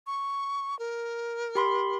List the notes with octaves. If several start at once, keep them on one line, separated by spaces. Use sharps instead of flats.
C#6
A#4
G4 B5 C6